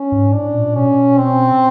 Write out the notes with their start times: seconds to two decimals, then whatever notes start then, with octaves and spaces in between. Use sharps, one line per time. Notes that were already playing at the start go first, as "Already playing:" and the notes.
Already playing: C#4
0.12 G#2
0.33 A2 D4
0.54 A#2
0.75 B2 C#4
1.18 C4